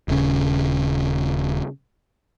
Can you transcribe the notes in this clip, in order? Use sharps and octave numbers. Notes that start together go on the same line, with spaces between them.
D#1 C#3